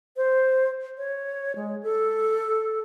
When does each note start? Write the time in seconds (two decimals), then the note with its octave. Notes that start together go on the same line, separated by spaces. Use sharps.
0.17 C5
0.98 C#5
1.56 G#3
1.83 A4